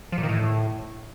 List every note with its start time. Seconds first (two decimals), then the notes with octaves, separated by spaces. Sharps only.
0.12 F3
0.18 A#2
0.23 D#3
0.29 A2